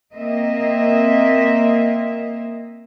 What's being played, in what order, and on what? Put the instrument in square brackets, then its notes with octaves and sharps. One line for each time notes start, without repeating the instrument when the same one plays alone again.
[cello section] A#3 C4 D#5 E5